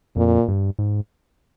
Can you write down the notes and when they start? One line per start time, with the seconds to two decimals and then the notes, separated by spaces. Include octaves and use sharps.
0.16 F2 A#2
0.48 G2
0.79 G#2